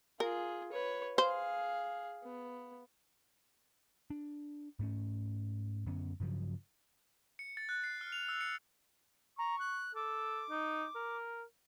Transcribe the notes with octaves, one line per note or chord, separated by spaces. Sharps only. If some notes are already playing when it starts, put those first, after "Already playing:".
F4 G#4 A#4
B4 C#5
G#4 C5 F5
B3
D4
G#2 A3 C#4
F#2 D3 B3 C#4
G2 C#3 F3 F#3
C#7
A6
F#6
C7
F6
F7
E6
C#7
A#5 C#6
F#6
A4 D6
D#4
A#4